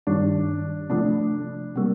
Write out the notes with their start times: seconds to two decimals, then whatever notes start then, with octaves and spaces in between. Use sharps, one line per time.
0.07 G2 D#3 G3 D4
0.90 C3 F3 A3 D4
1.76 C3 G3 A#3